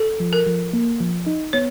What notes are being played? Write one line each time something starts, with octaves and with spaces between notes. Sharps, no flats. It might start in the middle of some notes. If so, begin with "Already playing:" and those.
Already playing: A4
F3
A#4
F3
A#3
F3
D#4
B3 C#5